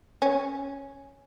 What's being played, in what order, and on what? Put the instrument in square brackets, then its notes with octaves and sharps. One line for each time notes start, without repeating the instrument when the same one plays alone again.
[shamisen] C#4